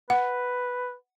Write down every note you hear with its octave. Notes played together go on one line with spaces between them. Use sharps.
B4 F#5